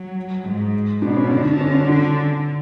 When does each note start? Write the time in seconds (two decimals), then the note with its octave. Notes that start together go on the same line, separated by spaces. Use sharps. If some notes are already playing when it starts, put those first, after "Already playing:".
Already playing: F#3
0.46 G#2
1.02 B2 D4
1.17 C#4
1.31 D3 D4
1.45 D4
1.60 C#4
1.74 D4
1.89 D4